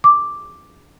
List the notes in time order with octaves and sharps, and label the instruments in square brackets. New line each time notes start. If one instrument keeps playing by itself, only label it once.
[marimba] D6